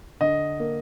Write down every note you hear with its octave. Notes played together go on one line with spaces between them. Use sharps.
D3 D#5
A#3